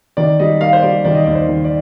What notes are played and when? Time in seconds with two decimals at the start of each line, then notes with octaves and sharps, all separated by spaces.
0.17 D#3 D5
0.39 G3 D#5
0.61 A#3 F5
0.73 C5
0.83 G3 D5
1.05 D#3 D5
1.15 D#5
1.24 D#2 D5
1.35 C5
1.49 D#3
1.64 D5